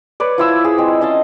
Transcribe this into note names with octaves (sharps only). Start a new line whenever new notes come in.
B4 C#5 D5
F3 E4 E6
G#4
G#3 C4
C#4 D#5 F5 A5